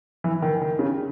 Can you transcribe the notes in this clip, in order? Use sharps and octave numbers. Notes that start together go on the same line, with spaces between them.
E3
D#3
D#3
C#3